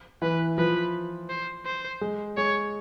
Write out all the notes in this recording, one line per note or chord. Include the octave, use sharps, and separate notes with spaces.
E3 B4
F3 B4
C5
C5
G#3
G#3 C#5